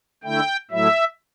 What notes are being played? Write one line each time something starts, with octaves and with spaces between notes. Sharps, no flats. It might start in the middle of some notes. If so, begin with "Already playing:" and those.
D3 A3 E4 G5
A2 F#3 A3 E4 E5